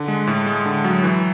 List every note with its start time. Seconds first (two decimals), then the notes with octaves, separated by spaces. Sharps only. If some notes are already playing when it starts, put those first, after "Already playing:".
Already playing: D3
0.08 G#3
0.27 A2
0.46 G#3
0.66 D3
0.84 F#3
1.04 E3